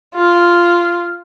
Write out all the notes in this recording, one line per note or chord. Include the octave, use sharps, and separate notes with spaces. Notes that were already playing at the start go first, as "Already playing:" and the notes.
F4 F6